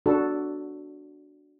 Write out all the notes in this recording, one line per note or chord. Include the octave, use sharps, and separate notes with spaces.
D4 F#4 A4